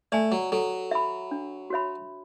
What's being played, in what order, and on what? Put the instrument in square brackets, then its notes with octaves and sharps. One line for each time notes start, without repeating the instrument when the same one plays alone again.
[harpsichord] A3 [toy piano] D5 G#5
[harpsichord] F#3
[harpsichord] F#3 [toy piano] A4
[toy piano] E5 B5
D4
F#4 C#5 E5 B5